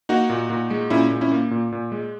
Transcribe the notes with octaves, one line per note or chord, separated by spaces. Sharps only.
A#3 D#4 F#4
A#2
A#2
G#3
A#2 C#4 E4
A#2
C#4 E4
A#3
A#2
A#2
G#3